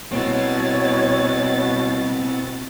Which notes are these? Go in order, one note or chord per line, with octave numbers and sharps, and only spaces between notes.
B2 C4 E4 C#5 A6